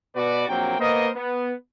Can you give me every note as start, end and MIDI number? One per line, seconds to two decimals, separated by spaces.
0.15 0.47 47
0.15 0.47 66
0.15 0.47 71
0.15 0.47 74
0.48 0.78 34
0.48 0.78 54
0.48 0.78 58
0.48 0.78 60
0.48 0.78 79
0.79 1.09 58
0.79 1.09 59
0.79 1.09 70
0.79 1.09 72
0.79 1.09 75
1.15 1.52 59